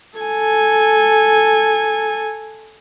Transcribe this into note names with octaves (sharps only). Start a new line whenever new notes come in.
A4 G#5